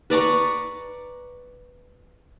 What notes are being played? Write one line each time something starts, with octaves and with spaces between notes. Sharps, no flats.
B4 D5 A#5 C#6